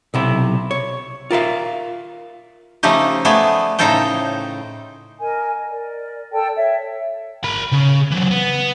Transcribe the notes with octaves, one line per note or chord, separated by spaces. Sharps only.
B1 C3 E4
C#5
F4 A#4 E5 F5
C#3 F3 A3 D#4 G4
A3 B3 G#4 D5
A2 C#3 D#4 A4 C5 G5
A#4 D#5 G#5
A#4 D5
A4 D5 G5 A5
C#5 E5
A#4 B5
C#3
E3 F#3
B3